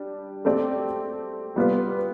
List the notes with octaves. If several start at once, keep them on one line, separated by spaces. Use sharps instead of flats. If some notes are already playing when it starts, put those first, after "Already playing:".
Already playing: G3 D4 G4
A3 C4 G4 D5
G3 B3 F4 B4